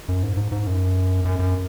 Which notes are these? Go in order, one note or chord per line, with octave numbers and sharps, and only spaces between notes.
F#2
G#2
G#2
G#2
F#2
F#2
F#2